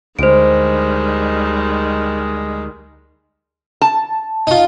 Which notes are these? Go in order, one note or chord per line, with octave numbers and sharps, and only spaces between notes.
D2 D#3 G3 G#3 C5 D7
A5
D#4 F4